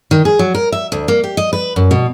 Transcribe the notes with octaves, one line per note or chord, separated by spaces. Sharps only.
D#3
G#4
F#3
A#4
E5
D2
A#3
G4
D#5
B4
F#2
B2